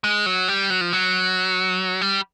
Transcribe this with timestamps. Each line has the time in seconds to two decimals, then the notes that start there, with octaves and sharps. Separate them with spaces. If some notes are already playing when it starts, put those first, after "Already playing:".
0.04 G#3
0.26 F#3
0.48 G3
0.70 F#3
0.81 F3
0.93 F#3
2.01 G3